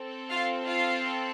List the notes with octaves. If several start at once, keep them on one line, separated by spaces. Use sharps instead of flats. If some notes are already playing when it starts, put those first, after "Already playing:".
Already playing: C4 A4
F4 F5
F4 F5